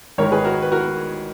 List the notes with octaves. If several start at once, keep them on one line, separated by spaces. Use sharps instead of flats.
G#1 G#2 D#3 A#4 C#5
G#4 B4
F#4 A#4
B4
F#4 A#4